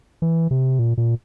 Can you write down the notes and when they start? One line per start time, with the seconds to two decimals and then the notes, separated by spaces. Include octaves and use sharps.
0.22 E3
0.51 C3
0.79 A#2
0.98 A#2